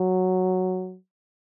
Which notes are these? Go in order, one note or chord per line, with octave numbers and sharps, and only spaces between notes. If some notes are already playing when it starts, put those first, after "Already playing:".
Already playing: F#3